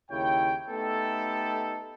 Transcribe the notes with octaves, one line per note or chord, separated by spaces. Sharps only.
D#2 C#3 E4 C#5 G5
A3 B3 D#4 G4 A4